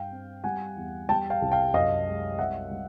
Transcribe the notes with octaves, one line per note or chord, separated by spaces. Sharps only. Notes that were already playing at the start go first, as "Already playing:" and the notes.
Already playing: G2 F5 G5
C4
G3 F#5 G#5
E2
G3 G5 A5
F5 G5
C2
F5 G5
F#2 D#5 F5
G#3
C2 E5 F#5
G3